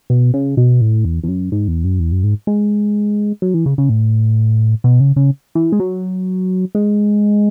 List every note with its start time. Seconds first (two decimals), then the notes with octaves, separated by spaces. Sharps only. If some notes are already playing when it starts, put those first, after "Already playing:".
0.10 B2
0.34 C#3
0.57 B2
0.81 A2
1.05 E2
1.24 E2
1.28 F#2
1.52 G#2
1.68 E2
1.84 F#2
2.00 E2
2.12 F#2
2.24 G#2
2.47 G#3
3.42 F#3
3.54 E3
3.66 C#3
3.78 C#3
3.89 A2
4.84 B2
5.00 C#3
5.16 C#3
5.55 E3
5.72 G#3
5.80 F#3
6.75 G#3